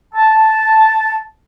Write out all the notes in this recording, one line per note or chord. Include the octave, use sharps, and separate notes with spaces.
A5